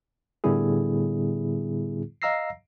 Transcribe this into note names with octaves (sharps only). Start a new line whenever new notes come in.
A2 D3 G3 B3 E4 G#4
D#5 F5 A#5 E6 A#6 C7